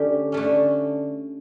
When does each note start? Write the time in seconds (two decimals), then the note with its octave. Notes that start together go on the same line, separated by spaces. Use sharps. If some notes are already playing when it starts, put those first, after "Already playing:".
Already playing: D3 A3 C#4 G4
0.32 D3 A3 C#4